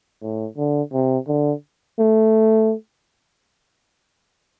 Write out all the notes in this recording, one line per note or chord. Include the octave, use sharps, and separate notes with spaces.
A2
D3
C3
D3
A3